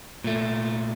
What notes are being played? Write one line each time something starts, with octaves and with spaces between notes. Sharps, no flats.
A#2 A3